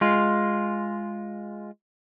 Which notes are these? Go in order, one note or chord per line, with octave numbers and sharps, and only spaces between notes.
G#3 F4